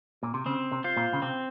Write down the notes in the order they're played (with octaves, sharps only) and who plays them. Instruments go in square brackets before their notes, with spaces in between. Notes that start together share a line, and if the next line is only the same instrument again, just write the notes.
[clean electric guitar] A#2
C3
[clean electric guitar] C#3 [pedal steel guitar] C4
[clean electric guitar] C3
[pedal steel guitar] F4 C5
[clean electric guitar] A#2
C#3
[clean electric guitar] C3 [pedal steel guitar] C4